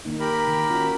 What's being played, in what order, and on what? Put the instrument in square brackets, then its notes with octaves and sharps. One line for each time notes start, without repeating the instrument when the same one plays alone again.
[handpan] D#3 A#3 D#4
[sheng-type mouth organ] G4 A#4 B5
[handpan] D#3
C#4 F4 F#4